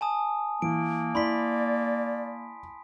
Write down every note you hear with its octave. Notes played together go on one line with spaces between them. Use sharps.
G#5 A5 D#6
E3 A#3 D7
E4 D5 B5 C6 B6